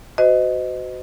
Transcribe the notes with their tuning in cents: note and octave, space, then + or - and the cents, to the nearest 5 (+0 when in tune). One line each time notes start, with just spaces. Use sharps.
F#4 +5 C5 -40 D#5 +0